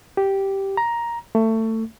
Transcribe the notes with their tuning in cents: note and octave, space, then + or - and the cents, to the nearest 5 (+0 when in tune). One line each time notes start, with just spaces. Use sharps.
G4 -5
A#5 +10
A3 +20